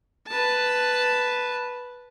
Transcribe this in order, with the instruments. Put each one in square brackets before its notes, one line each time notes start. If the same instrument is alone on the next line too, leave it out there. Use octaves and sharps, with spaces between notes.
[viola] B4 A5